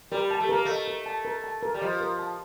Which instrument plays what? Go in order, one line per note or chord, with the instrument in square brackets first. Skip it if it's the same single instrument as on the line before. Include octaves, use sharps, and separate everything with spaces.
[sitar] G3 [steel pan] A#4
[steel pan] A5
[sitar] A3
[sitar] A#3 [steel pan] A#4
[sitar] A3 [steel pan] D#5
[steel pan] A#4
A5
A#4
A5
A#4
[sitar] G3
[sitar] F3 [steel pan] D#5
[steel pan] A#4
A5